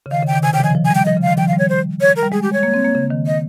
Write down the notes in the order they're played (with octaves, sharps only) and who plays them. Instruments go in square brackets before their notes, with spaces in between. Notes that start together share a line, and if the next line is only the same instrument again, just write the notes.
[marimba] C#3
[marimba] D#3 [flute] F5
[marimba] C#3
[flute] G5
[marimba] D#3
[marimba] C3 [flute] G#5
[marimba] C#3 [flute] G5
[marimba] F3
[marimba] D#3 [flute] G#5
[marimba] F3
[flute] G#5
[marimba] G3
[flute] G5
[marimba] F3 [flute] D#5
[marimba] C#3
[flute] F5
[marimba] D#3
[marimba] F3 [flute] G5
[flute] F5
[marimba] G3
[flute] C#5
C5
C#5
A#4
[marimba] G3
[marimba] G#3 [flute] G#4
[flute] G4
C#5
[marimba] A#3
C4
A#3
C#3
D#3
[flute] D#5